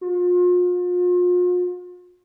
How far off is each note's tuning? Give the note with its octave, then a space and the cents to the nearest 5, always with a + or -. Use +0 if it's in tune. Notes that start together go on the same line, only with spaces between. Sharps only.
F4 +40